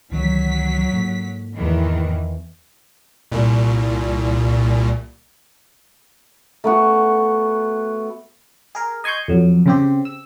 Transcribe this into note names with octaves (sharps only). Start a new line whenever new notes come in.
C#2 D#3 E3 F#3 B6
G#2 A#3
E2 D#3 E3
C2 A#2
A3 B3 F#4
G#4 A#4
D#5 G#5 C6 C#6 G6
F2 F#3
C#3 C4 G4
E6